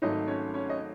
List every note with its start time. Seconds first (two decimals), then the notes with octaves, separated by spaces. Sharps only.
0.02 G#1 G#2 F#3 A3 D#4 D#5
0.28 C#4 C#5
0.54 C#4 C#5
0.70 D#5